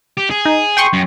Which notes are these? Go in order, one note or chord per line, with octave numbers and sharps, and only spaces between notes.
G4
G#4
D#4
G5 C6 C#6
F#2